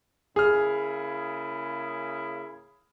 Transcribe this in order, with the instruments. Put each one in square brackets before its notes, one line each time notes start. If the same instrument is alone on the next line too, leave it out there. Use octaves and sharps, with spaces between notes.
[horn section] C#3 A#3 E4 [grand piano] G#4 F6